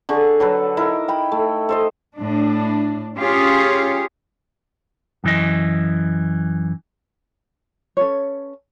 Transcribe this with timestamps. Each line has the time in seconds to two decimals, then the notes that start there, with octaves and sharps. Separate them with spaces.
0.09 D3 G#4 C#6
0.40 F#3 A4 B4
0.77 D#4 E4 A#4
1.08 G5 B5
1.32 A3
1.69 A4 C5 D#5
2.17 A2 D4
3.18 C#4 F4 G4 G#4 C#5
5.24 F#2 E3 D#5
7.97 C#4 A4 B4 C#5